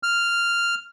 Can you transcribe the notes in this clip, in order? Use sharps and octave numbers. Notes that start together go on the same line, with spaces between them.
F6